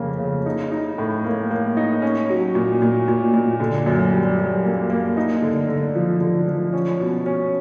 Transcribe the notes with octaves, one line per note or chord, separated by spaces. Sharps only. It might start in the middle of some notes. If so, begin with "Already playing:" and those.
Already playing: F2 C#3 A#3
C#3
D#4
D#4
A2
A#3
A#3
D#4
C#4
F#3
A#2
A#2
A#2
A#2
D3
F#2
G3
F#2
A#3
A#3
D#4
D3
D3
F3
D3
F3
C#4
B2
C#4